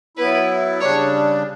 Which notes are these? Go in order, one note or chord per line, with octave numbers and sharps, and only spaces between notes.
F#3 B3 E4 B4
C#3 G3 D4 C#5